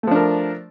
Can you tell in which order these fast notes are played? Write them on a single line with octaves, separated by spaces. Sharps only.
A3 F3 D4 A#4